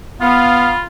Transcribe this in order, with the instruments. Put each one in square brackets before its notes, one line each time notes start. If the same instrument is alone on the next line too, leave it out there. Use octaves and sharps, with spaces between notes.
[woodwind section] B3 [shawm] F4 [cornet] F5 [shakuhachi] B5